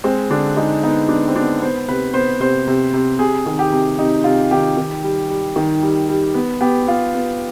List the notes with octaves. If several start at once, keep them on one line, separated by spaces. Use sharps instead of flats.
G#3 C4
D3 D4
G#3 D#4
B3 D#4
B3 D4
C4
B3 D4
B3 C5
C3 B4
B3 C5
C3 C5
C3
C3
C3 G#4
D#3
G4
C3
C3 D#4
C3 F4
D#3 G4
D#3
G3
G3
D#3
G3
G3
B3
B3 G4
B3 F4
B3